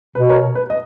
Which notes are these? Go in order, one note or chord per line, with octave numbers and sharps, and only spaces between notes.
B2 B4
A#4 C#5
B4
D#5